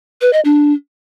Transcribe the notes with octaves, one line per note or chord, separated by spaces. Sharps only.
B4
D#5
D4